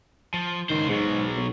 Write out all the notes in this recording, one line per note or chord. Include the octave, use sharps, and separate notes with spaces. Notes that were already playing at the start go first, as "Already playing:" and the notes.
F3
C#2 D#3 C5
G#2 B2 F#3
B1